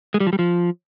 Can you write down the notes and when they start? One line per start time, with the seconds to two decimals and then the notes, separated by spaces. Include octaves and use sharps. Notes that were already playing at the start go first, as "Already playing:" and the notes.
0.14 G#3
0.20 G3
0.27 F3
0.33 G3
0.39 F3